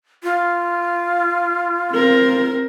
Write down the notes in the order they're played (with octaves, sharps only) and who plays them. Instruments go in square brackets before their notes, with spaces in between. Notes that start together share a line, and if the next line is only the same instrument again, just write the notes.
[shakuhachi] F4
[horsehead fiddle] C4 A#4